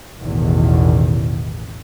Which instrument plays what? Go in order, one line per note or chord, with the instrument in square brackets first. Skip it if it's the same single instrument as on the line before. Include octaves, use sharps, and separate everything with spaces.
[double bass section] A1 E2 B2 D#3